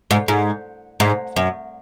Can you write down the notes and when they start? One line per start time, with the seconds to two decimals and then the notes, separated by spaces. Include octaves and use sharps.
0.11 G#2
0.28 G#2
1.00 G#2
1.36 F#2